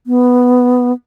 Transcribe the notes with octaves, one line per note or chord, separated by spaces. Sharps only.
B3